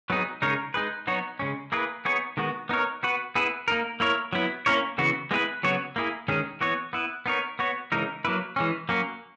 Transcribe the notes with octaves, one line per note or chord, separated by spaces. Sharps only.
F#3 B3 D#4 G#4
C#3 G#3 D#4 A#4 C#5
G#3 D#4 G#4 B4
F#3 B3 D#4 F#4 C#5
C#3 G#3 C#4
A#3 E4 G#4 B4
B3 D#4 G#4 C#5
D#3 G#3 B3 F#4
B3 D#4 A#4 C#5
B3 F#4 B4
B3 E4 G#4 B4
A#3 D#4 A#4
A#3 E4 A#4 C#5
F#3 B3 E4
A#3 C#4 E4 A#4 C#5
C#3 E3 B3 F#4
G#3 B3 E4 G#4 B4
C#3 F#3 B3 F#4 C#5
A#3 E4 G#4
D#3 G#3 C#4 G#4
E3 B3 F#4 C#5
B3 E4 B4
B3 D#4 A#4 C#5
B3 F#4 C#5
C#3 E3 G#3 D#4 A#4
F#3 A#3 E4 B4
E3 G#3 C#4
F#3 A#3 C#4